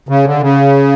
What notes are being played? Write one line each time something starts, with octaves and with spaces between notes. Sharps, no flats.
C#3
D3
C#3